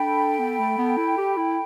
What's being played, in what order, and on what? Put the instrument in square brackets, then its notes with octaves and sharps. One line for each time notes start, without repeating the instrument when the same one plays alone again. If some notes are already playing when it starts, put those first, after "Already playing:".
Already playing: [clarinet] D4 [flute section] A4 G5 B5
[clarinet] B3
A3
B3
E4
G4
E4